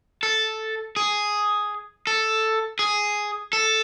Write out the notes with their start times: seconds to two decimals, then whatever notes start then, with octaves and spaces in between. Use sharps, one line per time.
0.23 A4
0.96 G#4
2.07 A4
2.79 G#4
3.53 A4